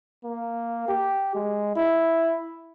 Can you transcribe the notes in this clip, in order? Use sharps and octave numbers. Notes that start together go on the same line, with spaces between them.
A#3
G4
G#3
E4